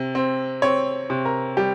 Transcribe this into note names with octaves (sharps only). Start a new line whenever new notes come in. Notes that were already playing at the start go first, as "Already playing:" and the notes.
Already playing: C3
C4
C4 C#5
C3
A#4
G3 G4